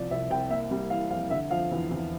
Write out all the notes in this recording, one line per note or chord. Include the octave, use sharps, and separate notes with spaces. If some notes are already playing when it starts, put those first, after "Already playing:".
Already playing: C2 F3 D5
C2 E5
C2 G5
A#3 E5
G3
E3 F5
F2 F5
D3 E5
F3 F5
E2
E2